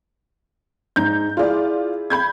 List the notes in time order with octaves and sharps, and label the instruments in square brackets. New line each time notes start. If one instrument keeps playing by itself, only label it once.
[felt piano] G#2 A#5 [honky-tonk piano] G6
[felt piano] E4 G#4 [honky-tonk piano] F4 D5
[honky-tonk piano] B5 G6 G#6